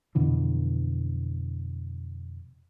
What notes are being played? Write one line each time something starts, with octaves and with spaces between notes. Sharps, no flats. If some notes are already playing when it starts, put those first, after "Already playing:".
F2 B2 D3 E3